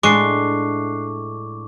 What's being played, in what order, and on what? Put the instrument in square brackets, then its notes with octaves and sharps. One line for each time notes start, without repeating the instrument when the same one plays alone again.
[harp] A2 A3 D4 [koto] G#3 [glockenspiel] C#6 D6 [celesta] F#6 C7